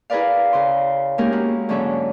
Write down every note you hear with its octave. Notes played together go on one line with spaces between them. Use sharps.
E4 G#4 A#4 B4 D5 F5
C#3 C6
G#3 A#3 C#4 D#4 G4 A#4
A#3 E4 F#4
G#2 D3 F#3 C#4 E5